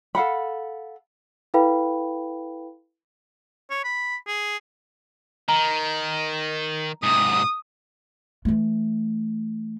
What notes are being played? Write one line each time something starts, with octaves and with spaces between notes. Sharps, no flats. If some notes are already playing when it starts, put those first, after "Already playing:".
A4 F5 F#5 B5
E4 A4 B4 F5 G5 B5
C#5
B5
G#4
D#3 A#5
G#2 C3 D#6
E3 A3